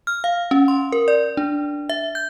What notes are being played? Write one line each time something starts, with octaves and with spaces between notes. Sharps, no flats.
F6
F5
C#4
C6
A#4
D5
D4
E5
G6